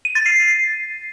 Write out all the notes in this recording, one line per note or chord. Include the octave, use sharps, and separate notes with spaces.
D#7
A6
C7